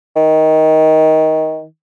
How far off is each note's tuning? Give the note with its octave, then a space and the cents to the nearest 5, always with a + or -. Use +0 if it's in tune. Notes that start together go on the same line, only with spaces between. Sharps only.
D#3 +15